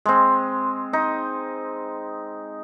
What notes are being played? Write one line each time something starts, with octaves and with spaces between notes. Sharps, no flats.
G#3 C4
D#4